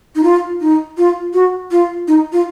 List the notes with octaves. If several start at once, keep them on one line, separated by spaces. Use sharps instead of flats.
D#4
F4
D#4
F4
F#4
F4
D#4
F4